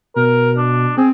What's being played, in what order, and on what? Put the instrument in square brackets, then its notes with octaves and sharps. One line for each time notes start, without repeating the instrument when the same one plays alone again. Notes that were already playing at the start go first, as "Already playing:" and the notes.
[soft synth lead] B2 [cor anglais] A#4
[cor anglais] D4
[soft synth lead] C4 [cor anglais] G#4